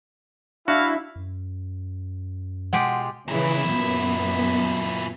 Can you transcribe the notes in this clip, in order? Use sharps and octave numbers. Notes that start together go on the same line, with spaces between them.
D4 E4 F#4 F5
F#2
B2 G#3 F4 G4 F#5
A#2 C#3 E3 E4
F#2 B3